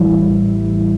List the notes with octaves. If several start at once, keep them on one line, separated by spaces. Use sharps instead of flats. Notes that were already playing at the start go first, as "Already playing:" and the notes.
Already playing: A1 A2 E3 G3 E4
A1